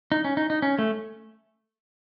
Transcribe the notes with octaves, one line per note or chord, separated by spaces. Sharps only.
D#4
C#4
D#4
D#4
C#4
A3